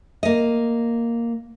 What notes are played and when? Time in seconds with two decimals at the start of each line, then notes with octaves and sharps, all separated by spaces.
0.23 A#3 D#5